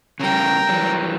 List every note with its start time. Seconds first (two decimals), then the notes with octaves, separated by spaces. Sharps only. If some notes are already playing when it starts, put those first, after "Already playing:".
0.20 C#3 G3 A#4 G5
0.69 E3 F#3 G3